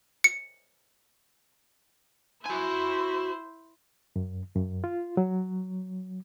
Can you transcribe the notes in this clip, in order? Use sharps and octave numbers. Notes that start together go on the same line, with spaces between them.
C#7
E4 F#4 C5 G#5
F#2
F#2
F4
F#3